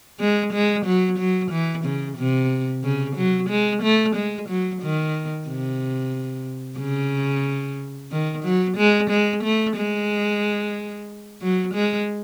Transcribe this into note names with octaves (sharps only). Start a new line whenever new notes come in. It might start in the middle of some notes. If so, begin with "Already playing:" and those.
G#3
G#3
F#3
F#3
E3
C#3
C3
C#3
F#3
G#3
A3
G#3
F#3
D#3
C3
C#3
D#3
F#3
G#3
G#3
A3
G#3
F#3
G#3